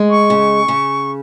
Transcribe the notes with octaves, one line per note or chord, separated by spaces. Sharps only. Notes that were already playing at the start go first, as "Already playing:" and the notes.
Already playing: G#3
C#6
C#3
C#3